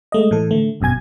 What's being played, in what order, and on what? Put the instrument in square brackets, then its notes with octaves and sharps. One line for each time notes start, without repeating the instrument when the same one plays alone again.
[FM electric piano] G#3 A3 D#5
A2 E3 A4
D3 A3
G#1 F#2 B2 G#5 G#6